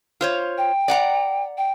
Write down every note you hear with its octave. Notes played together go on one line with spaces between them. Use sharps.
F4 C5 C#5
G5
D5 F#5 A#5
G5